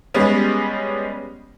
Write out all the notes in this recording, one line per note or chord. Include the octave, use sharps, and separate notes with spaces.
G3 G#3 B3 C#4